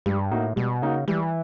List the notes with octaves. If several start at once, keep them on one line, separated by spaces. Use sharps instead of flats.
G2 G3
A2 A#3 D#4 F#4
B2 G3
C#3 A#3 D#4 F#4
E3 G3